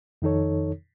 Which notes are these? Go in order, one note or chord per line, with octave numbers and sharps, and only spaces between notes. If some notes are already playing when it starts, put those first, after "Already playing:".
F2 D#3 D#4 A4 C#5